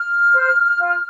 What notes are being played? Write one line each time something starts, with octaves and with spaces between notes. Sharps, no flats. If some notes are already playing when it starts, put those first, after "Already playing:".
Already playing: F6
C5
F4